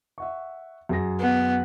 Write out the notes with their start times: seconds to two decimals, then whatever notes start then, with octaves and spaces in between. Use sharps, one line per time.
0.18 E5 F#5 C#6
0.89 F#2 G#4 A#6
1.20 B3